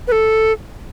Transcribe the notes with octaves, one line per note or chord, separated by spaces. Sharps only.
B4
A4